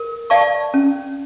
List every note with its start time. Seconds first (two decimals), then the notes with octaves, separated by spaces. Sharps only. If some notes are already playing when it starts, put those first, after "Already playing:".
Already playing: A#4
0.30 D5 F5 A5 C#6
0.74 C#4